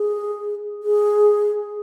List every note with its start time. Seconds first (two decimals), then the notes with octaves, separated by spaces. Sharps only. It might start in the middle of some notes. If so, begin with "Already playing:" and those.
Already playing: G#4
0.83 G#4